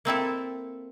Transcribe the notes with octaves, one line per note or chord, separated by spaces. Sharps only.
A#3 C4 E4 A4